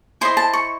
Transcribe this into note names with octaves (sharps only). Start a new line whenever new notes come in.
E4 C5 D#5 C6
A5
C#6